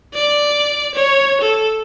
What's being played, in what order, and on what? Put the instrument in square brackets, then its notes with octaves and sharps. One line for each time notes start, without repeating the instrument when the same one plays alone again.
[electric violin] D5
C#5
A4